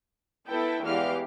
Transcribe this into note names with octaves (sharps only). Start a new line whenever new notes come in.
B3 E4 A4 B4 G5
E2 E3 G#3 G4 F5 F6